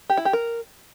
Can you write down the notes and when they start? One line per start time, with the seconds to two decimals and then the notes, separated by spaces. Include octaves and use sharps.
0.10 G4
0.17 E4
0.25 G4
0.33 A#4